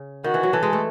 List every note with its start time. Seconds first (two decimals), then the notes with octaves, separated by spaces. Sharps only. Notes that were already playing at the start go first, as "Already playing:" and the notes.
Already playing: C#3
0.24 D#3 F#4
0.34 E3
0.43 F#3
0.53 E3 A4
0.63 G#3
0.73 A3